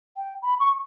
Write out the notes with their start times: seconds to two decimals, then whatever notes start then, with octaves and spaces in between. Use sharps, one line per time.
0.16 G5
0.42 B5
0.59 C#6